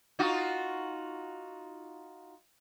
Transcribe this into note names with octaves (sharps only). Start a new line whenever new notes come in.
D#4 F4 F#4